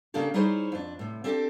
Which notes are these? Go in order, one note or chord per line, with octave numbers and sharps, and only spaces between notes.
C#3 A#3 C#4 D4 G4 A4
G3 D#4 E4 G#4 C5 C#5
F2 D4
A2 C3
C4 D4 G4 A4